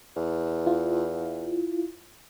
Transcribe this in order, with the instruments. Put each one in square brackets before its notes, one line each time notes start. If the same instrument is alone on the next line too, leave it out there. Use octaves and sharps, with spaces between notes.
[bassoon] E2
[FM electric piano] E4 F4